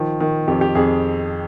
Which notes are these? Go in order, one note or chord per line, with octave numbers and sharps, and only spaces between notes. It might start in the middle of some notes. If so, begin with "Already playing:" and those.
Already playing: D#3 F3
D#3
F2 G4
G4
F2 G#4